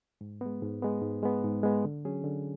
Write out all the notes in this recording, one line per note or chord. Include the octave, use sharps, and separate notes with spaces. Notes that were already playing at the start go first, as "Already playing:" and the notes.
G#2
G#3 B3
G#2
G#3 B3
G#2
G#3 B3
G#2
G#3 B3
D3
F#3 C#4 G#4
D3